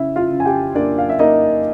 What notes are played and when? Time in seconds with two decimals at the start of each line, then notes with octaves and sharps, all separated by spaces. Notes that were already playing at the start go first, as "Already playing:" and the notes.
Already playing: C#3 E4 E5
0.16 F4 F5
0.31 C#3
0.40 G#5
0.46 G4 G5
0.75 A#3 D4 D5
0.98 F5
1.09 E5
1.19 A#3 D#4 D#5